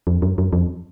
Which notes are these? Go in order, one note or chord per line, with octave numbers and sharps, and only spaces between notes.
F2
F#2
F#2
F2